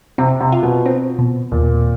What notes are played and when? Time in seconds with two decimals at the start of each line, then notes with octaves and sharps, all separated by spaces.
0.18 C3 C4
0.41 C3
0.52 F4
0.63 B2
0.86 C4
1.19 B2
1.52 D#2 A#2